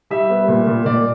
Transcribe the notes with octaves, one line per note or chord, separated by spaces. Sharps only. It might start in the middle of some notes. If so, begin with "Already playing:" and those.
G3 E5
B3
A#2
A#2
A#2 D5